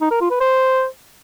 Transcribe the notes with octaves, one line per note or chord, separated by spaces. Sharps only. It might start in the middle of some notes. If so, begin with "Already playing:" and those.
D#4
A#4
F4
B4
C5